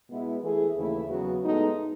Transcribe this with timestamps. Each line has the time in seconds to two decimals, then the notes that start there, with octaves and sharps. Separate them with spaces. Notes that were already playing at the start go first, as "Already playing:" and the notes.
0.09 B2 G#3 B3 E4
0.42 E3 A3 E4 G#4
0.75 D#2 C#3 E3 A3 E4
1.08 E2 C#3 F#3 B3 F#4
1.42 A2 G#3 B3 D#4 A4